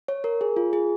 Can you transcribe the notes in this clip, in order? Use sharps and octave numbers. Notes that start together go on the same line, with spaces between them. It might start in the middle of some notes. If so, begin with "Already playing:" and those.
C#5
A#4
G#4
F4
G#4